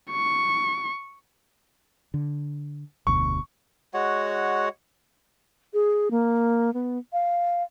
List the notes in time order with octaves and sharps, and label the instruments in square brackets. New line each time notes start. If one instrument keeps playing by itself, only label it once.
[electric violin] C#6
[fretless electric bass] D3
[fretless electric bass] F1 D2 B2 [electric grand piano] C#6
[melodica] G#3 F#4 C#5 F#5
[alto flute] G#4
A#3
B3
F5